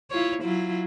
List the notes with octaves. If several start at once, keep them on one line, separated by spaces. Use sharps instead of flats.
E4 F4 C#5
F#3 E4 F4